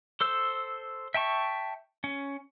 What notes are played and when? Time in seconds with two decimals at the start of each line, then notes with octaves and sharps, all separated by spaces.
0.21 A4 C5 E6
1.14 E5 G5 A5 C#6
2.04 C#4